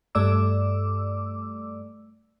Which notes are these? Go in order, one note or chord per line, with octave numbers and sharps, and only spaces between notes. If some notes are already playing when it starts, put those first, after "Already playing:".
G2 A3 D5 D6 E6